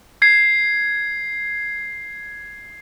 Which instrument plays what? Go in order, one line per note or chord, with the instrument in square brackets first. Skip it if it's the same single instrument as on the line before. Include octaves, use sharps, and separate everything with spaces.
[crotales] G#6 C7